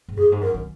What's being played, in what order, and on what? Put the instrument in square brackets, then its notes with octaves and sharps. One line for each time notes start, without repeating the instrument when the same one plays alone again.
[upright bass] G#2
[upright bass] F#2 [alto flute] G#4
[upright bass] G#2
[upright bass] F#2 [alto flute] A#4
[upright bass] D#3